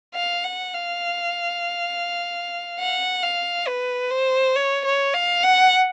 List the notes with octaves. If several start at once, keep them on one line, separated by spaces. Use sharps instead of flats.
F5
F#5
F5
F#5
F5
B4
C5
C#5
C#5
F5
F#5